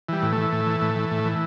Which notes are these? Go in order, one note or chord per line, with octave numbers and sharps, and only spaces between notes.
E3 G3
A2
E3 A3
A2
E3
A2
E3
A2
E3